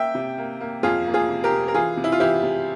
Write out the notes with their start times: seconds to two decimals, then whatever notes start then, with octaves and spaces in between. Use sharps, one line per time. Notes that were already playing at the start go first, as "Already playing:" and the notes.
Already playing: A#3 E5 G5
0.15 C3
0.38 A#3
0.61 A#3
0.83 F2 F4 G#4
1.07 A#3
1.14 F4 G#4
1.29 C3
1.44 G4 A#4
1.52 C3
1.68 A#4
1.74 E3 F4 G#4
1.97 C3
2.04 E4
2.12 F4
2.20 E3 E4 G4
2.43 C3